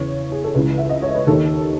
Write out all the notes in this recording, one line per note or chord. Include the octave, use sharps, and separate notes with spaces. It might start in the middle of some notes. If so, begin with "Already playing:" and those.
Already playing: E2 C#3 E3 C#5
G#4
A4
C#2 C#3 E3 B4
E5
D#5
C#5
B4
D#2 D#3 A4